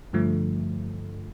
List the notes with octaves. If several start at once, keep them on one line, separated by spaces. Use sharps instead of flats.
G2 D3 F3 A3